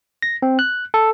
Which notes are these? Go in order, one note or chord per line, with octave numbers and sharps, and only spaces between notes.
A#6
C4
F#6
A4